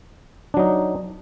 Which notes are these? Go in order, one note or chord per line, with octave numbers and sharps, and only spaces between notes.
F#3 D4 D#4